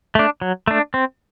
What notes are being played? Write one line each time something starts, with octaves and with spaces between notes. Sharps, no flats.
A3 D4
F#3
A3 D4
C4